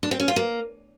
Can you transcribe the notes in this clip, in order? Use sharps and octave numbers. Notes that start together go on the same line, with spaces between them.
D4
C4
C#4
F4
A#3